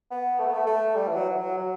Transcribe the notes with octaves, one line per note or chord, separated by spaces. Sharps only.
B3
A3
B3
A3
A3
G3
E3
F#3
E3
F#3
F#3